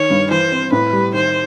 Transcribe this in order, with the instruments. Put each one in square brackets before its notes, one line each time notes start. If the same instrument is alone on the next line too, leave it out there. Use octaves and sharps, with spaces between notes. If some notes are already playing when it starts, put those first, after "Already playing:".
Already playing: [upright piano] D#3 [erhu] C#5
[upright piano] G2
[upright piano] E3 [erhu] C5
[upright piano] C4
[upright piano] A2 [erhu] B4
[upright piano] G3
[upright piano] D#3 [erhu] C5